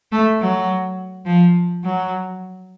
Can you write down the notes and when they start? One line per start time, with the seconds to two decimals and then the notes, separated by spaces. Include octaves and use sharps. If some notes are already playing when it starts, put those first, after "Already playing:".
0.12 A3
0.41 F#3
1.26 F3
1.84 F#3